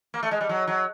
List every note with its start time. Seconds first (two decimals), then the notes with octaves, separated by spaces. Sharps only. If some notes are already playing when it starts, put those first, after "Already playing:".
0.14 A#3
0.23 A3
0.31 G#3
0.41 G3
0.49 F#3
0.67 F#3